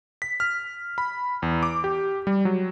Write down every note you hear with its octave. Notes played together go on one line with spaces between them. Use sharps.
B6
F6
B5
E2
D6
G4
G3
F#3